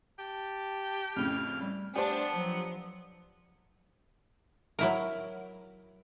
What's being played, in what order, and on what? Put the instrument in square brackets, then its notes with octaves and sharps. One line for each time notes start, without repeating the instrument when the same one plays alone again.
[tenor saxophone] G4 [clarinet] A5
[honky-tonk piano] F2 A2 C#3 [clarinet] F6
[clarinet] G3
[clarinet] A3 [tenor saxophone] B3 [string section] D4 [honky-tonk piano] G4 C5
[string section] F3 [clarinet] F#3
[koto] F#3 E4 A#4